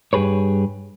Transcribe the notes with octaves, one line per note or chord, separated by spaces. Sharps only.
G2 G4 G#4 B4 C#5